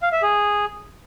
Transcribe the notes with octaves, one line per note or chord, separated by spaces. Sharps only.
F5
E5
G#4